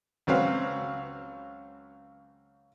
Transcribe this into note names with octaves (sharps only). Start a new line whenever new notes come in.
C#2 F#3 C4 B4 F5